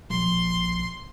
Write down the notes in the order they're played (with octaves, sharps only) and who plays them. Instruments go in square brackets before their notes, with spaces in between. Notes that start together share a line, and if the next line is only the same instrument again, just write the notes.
[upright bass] A#1 [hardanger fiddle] C6